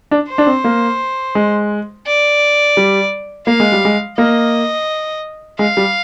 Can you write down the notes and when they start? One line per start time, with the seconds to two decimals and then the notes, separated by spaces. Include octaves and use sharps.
0.11 D4
0.29 C5
0.38 D4
0.47 C4
0.64 A#3
1.35 G#3
2.06 D5
2.77 G3
3.47 A#3 F5
3.60 G#3
3.72 G3
3.85 G#3
4.18 A#3 D#5
5.59 G#3 F5
5.77 G3